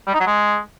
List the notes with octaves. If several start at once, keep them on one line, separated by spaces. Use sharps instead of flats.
G3
D#4
F#3
G#3